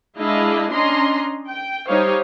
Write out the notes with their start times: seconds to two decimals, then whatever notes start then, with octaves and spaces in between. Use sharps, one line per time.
0.18 G#3 D4 E4 D#5 F5
0.72 C#4 D4 D#5 A#5 C6
1.48 G5
1.87 G3 D#4 G4 C5 C#5 F5